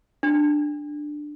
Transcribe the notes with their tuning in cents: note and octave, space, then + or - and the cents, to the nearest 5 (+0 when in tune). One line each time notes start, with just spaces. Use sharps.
D4 +10